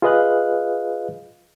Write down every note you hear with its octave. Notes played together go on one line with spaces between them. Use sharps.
F4 G#4 B4 D#5 F5 F#6